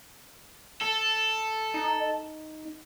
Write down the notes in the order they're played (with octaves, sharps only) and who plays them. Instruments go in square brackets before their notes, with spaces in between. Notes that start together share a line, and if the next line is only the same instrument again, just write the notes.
[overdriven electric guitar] A4
[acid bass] D#4